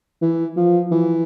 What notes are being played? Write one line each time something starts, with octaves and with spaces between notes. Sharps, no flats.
E3
F3
E3